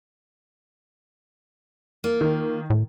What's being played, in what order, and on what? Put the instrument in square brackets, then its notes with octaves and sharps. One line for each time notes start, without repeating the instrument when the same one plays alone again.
[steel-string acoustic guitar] A#3 F4
[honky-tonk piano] D#3
[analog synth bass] A2